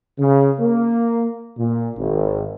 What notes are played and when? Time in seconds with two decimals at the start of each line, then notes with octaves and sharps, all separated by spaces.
0.19 C#3
0.60 A#3
1.58 A#2
1.97 G#1